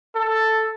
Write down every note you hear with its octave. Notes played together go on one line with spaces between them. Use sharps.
A4